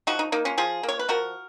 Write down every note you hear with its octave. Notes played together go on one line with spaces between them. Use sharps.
F3 D#4 F#4
D#4
A#3 D#4
C#4 F4
F3 F4 G#4
A#3
C#5
B4
F3 F#4 A#4